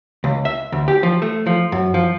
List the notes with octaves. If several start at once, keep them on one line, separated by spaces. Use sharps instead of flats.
C#2
E5
D2
G4
F3
A3
F3
F#2
F3